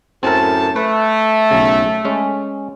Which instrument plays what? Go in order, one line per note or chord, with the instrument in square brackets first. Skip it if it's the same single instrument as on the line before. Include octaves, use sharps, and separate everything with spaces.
[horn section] F#2 A2 A5 [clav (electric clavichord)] C4 A#4
[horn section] A3 [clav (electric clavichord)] B4
[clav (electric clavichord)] B1 C#3
G#3 C#4